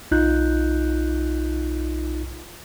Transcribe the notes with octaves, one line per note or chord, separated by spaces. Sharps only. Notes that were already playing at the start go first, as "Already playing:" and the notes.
B1 D#4 F4 F#6 G6